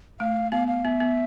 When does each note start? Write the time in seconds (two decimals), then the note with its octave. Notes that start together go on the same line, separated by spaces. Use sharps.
0.20 A3 F5
0.52 B3 F5
0.68 F5
0.85 B3 E5
1.00 B3